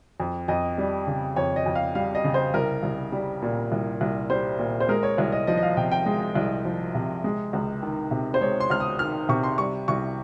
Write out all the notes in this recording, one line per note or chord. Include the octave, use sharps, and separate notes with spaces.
F2
F2 D#5
G3
C#3
F2 C#5
D#5
F2
F5
G3 F5
D#5
C#3
C5
C2 A#4
C2
G3
A#2
C2
C2
G3 C5
A#2
C5
G#3 A#4
C#5
C2 C#5
D#5
F3 D#5
D#5
F5
C3 G5
G5
G#3
C2
F3
C3
G#3
C#2
D#3
C3
C5
G#3 C#5
C6
C#2 F6
D#6
D#3 F6
C3 C#6
C6
G3 C#6
C2 C#6